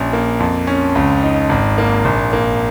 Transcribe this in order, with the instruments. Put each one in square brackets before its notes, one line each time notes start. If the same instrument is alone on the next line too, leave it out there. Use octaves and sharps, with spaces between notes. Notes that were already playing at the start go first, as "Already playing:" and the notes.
Already playing: [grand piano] A#1 C#4
A#3
F2
C#4
C#2
D#4
G#1
A#3
A#1
A#3